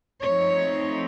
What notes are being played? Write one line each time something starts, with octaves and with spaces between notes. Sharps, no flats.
F3 A3 C4 D#4 C#5